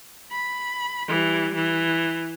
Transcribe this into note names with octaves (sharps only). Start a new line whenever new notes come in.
B5
E3 G3
E3